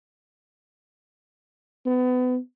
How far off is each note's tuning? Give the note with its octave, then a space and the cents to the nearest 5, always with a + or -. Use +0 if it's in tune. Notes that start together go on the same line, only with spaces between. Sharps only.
B3 +30